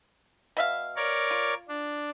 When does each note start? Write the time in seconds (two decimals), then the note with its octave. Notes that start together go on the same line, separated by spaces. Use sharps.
0.57 B2 E5 F5
0.96 A#4 C#5 D5
1.31 F4
1.68 D4